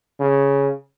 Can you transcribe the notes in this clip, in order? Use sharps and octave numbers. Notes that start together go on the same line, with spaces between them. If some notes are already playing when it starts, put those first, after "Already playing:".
C#3